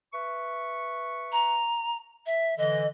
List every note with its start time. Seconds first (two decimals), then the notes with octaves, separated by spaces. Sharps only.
0.13 B4 E5 C#6
1.32 A#5
2.26 E5
2.58 D3 E3 D#5